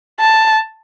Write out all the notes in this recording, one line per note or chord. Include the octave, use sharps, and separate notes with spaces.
A5